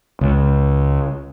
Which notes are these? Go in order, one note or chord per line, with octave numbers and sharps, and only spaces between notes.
C#2